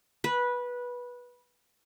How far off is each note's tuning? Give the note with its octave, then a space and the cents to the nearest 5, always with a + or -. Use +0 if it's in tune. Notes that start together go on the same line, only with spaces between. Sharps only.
B4 -15